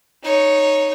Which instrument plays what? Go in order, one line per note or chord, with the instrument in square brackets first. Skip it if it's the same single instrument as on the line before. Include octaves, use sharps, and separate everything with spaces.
[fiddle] D#4 C#5